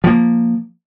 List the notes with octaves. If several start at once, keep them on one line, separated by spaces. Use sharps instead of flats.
F3 A#3